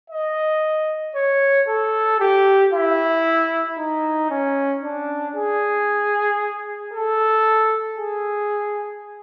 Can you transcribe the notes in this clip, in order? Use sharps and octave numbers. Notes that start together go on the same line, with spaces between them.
D#5
C#5
A4
G4
E4
D#4
C#4
D4
G#4
A4
G#4